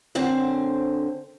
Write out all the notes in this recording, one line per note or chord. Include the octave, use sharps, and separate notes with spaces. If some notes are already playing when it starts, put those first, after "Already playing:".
F#2 D3 C4 C5